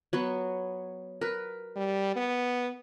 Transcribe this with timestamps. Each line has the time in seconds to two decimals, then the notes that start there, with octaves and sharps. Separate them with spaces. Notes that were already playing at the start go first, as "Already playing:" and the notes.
0.13 F#3 B3 C#5
1.21 A#4 B4
1.76 G3
2.16 B3